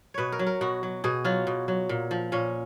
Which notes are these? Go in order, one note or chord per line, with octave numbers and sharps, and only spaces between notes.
B2 B4 C#5
A#4
F#3
A#4
B2 F#4
F#3
B2 G#4
F#3 F4
B2
F#3
A#2
F3
A#2 C#4